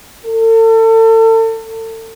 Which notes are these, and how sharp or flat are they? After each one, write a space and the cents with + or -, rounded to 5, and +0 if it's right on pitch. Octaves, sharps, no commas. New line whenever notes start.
A4 +35